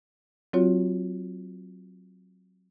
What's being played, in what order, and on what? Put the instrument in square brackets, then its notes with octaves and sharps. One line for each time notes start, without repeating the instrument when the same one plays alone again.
[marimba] F#3 C4 F4 F#4 C#5